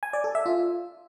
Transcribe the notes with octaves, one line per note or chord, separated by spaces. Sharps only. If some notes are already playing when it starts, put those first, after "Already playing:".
G#5
D5
A4
E5
F4